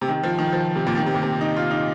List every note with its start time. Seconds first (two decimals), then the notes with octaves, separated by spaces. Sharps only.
0.01 C3
0.08 D#3
0.23 F3
0.39 D#3
0.53 F3
0.75 C3
0.87 A#2
0.97 D#3
1.06 C3
1.14 A#2
1.23 C3
1.41 D#4
1.56 F4
1.71 D#4